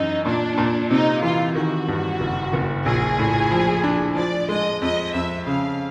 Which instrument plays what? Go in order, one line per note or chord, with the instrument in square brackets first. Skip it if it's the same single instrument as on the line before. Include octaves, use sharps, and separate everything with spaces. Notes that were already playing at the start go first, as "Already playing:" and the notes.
Already playing: [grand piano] F#2 E3 [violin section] D#4
[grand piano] A#2 [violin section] D4
[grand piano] A#2
[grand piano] C3 [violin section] D#4
[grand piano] E3 [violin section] F4
[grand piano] D#3 [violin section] F#4
[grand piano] G2
F#1
F#1
[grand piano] A#1 [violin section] G#4
[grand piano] A2
F3
D4
[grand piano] F3 [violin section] D5
[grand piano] G#3 [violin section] D#5
[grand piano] F2 [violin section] D#5
[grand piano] F2 [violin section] E5
[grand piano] C#3 [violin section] F5